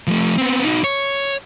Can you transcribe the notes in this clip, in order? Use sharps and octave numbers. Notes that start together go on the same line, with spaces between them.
F3 A3
B3 C4
D#4 F#4
C#5